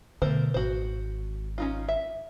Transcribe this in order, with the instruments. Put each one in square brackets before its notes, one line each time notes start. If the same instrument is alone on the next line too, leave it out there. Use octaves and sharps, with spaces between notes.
[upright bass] B2 D3 [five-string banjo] A3 A#4 C5
[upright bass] G#1 [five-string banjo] F#4 C5
[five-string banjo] C#4 D#4 F4
E5